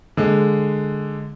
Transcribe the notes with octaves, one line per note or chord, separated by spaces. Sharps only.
D3 G#3